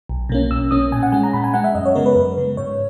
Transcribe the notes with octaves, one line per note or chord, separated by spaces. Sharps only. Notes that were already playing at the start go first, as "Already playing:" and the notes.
B1
B2 A#3 C#4
B1 E6
B2 A#3 C#4 D#6
A#2 G#5
F#5
G#3 C#4 G#5
A#5
A#2 B5
G#5
G#3 C#4 F#5
E5
F#2 D#5
C#5
C#3 G#3 B3 A#4
B4
F#2
C#3 G#3 B3
G#2 C#5